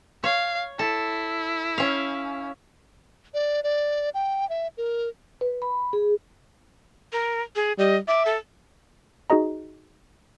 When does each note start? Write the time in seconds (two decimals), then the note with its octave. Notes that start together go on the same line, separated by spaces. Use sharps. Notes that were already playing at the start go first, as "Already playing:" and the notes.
0.24 C#5 F5
0.79 E4 A4
1.78 C#4 F5
3.34 D5
3.63 D5
4.14 G5
4.49 E5
4.77 A#4
5.41 B4
5.62 B5
5.93 G#4
7.13 A#4
7.56 G#4
7.79 G3 D#5
8.08 E5 D6
8.26 A4
9.30 D#4 F#4 G#4 D#5 A#5